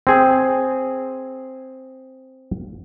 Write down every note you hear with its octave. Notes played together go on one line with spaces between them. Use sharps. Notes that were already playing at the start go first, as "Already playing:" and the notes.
C4 G#4